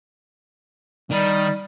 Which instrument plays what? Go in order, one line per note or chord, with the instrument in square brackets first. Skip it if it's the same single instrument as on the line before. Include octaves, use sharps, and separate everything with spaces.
[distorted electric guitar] D#3 [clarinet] G3